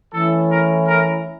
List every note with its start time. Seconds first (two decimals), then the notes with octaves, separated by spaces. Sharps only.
0.12 E3 A3 C#4 E4 A4
0.49 A#4
0.86 A#4